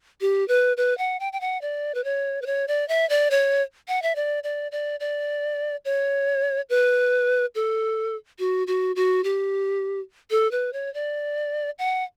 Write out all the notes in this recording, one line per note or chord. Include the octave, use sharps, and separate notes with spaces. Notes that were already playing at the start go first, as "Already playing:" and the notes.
G4
B4
B4
F#5
G5
G5
F#5
D5
B4
C#5
B4
C#5
D5
E5
D5
C#5
F#5
E5
D5
D5
D5
D5
C#5
B4
A4
F#4
F#4
F#4
G4
A4
B4
C#5
D5
F#5